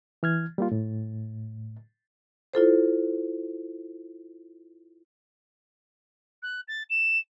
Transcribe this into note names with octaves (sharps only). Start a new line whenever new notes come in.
E3 F6 G#6
G3 A#3 F4
A2
E4 F4 A4 C5
F#6
A6
E7